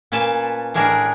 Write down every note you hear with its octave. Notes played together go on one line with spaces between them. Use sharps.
A#2 C#4 B4 A5
A2 G#3 C#4 D4 G#4 A#4